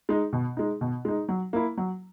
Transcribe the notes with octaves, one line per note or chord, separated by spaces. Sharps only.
G#3 D#4
B2
G#3 D#4
B2
G#3 D#4
F#3
A#3 E4
F#3